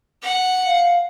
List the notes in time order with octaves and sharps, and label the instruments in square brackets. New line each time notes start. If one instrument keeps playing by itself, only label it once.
[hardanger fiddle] F#5
[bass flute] F5